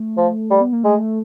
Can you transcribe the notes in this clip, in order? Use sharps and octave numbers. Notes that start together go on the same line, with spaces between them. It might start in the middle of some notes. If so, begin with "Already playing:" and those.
Already playing: A3
F3
G3
B3
A#3
G#3 A3